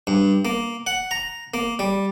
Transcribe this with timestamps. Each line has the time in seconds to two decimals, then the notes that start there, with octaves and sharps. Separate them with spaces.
0.07 G2
0.45 A#3
0.87 F#5
1.11 A#5
1.54 A#3
1.79 G3